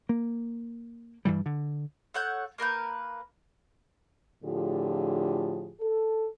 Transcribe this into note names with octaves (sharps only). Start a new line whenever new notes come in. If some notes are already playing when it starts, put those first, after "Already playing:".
A#3
G2 E3 G3
D3
A4 C#5 F#5 G6
A#3 A#4 B4 G6
A2 D3 F3 F4 G4 G#4
A4